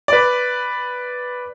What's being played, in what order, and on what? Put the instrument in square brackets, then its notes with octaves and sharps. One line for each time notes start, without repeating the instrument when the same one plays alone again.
[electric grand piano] B4 D5